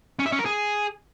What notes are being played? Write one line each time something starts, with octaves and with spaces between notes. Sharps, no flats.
C#4
E5
C#4
A#4
G#4